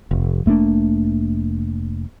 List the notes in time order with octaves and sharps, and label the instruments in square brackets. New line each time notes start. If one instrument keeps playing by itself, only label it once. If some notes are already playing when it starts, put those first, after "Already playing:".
[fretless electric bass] F1
F1 A3 A#3 D4